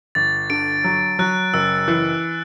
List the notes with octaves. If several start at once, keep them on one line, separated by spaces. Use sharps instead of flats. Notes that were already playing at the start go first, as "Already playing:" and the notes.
G1 A6
D3 D7
F#3
F#3 F#6
F#1 E6
E3